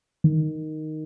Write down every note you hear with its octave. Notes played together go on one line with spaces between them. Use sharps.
D#3